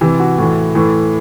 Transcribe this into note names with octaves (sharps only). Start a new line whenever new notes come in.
C3 E3 G4
F#4
A2 E3
A2 E3